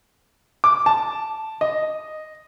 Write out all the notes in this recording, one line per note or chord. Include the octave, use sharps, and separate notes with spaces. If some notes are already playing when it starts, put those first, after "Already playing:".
D6
A5
D#5